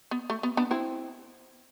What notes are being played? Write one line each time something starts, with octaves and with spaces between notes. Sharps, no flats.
B3
A3
B3
B3 D4
C4 E4